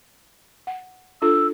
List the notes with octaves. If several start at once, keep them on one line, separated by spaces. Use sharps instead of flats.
F#5
D4 F4 A4 E6